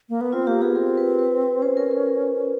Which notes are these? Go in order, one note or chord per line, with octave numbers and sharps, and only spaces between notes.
A#3
B3
C4 F4
A#3 G4
B3 G#4
C4 A#4
B4
B4
C#4 C5
A#4
A#4